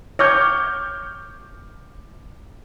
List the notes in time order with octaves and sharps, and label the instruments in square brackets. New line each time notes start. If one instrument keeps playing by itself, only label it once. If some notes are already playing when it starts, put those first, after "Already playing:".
[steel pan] C#5 [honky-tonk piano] D6 F6 G6